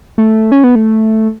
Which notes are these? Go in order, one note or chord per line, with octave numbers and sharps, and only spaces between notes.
A3
C#4
B3
A3